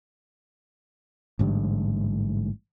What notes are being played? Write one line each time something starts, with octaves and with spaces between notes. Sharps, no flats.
A1 G#2 D3 G3